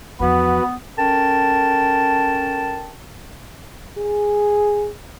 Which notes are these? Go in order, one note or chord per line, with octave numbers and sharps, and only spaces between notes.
E2 F3 B3 F#4 B4
C#4 A4 A#4 G5 A5
G#4